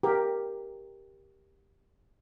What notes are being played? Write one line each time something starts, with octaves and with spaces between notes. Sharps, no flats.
G4 A#4